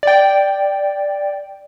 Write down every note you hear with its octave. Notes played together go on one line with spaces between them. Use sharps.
D5 G5